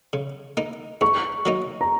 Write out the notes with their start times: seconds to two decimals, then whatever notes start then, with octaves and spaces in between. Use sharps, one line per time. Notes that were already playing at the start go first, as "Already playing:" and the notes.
0.13 C#3
0.57 A#3 D#4
1.01 G#2 C#6
1.45 F#3 A#3 D#4
1.81 A#5